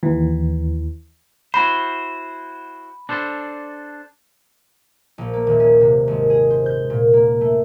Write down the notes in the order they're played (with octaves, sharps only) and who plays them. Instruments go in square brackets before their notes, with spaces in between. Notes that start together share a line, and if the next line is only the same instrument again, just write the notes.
[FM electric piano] D#2 E3
[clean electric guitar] E4 F#4 C5 [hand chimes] B5
[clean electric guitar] D4 A4 C5
[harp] A#1
A#3
D#1
C#4
C3
G#1
G#4
C5
G6
A#2
A#3
A3